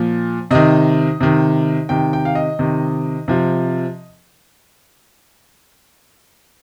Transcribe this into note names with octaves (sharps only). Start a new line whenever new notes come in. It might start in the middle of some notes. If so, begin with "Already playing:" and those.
Already playing: A#2 F3
C3 D#3 D#5
C3 D#3
C3 D#3 G5
G5
F5
D#5
C3 D#3
C3 F3